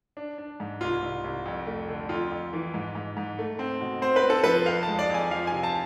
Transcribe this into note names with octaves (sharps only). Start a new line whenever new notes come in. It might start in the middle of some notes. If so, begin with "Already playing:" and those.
D4
D4
G#2
C2 F4
C2
C2
F2
A3
D3
F2 F4
F2
E3
G#2
G#2
G#2
A3
C4
B2
C4 C5
B4
C4
A4
F3 B4
F2 F5
A5
G#3
D5
F2 G#5
F3 F5
G#5
C3
A5